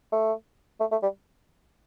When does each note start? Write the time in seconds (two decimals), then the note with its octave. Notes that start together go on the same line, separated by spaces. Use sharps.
0.12 A3
0.80 A3
0.92 A3
1.03 G3